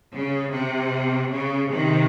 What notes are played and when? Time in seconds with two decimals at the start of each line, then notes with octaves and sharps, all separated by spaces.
0.14 C#3
0.53 C3
1.32 C#3
1.71 C3 D#3